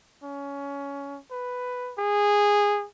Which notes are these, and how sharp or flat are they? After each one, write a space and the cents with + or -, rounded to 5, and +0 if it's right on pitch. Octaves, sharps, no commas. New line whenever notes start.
C#4 +20
B4 +5
G#4 -15